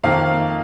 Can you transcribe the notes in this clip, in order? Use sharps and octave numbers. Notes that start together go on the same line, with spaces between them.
F2 D#3 A#3 F5